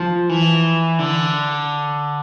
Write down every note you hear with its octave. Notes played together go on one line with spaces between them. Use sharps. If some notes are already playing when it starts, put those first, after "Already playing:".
Already playing: F3
E3
D3